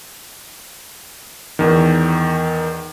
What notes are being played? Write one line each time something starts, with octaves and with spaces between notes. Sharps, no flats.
E2 D#3